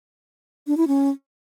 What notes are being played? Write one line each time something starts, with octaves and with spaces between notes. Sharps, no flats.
D4
E4
C#4